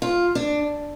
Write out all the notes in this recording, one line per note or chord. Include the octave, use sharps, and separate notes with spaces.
F4
D4